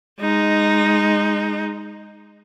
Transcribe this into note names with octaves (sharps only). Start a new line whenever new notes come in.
G#3 D#4